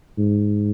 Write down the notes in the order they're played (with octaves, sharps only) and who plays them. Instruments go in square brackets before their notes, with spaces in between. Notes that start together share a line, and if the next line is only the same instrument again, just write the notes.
[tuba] G#2